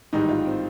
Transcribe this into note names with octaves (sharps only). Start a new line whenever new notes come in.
A1 G#2 D#3 G3 D#4
F4
C4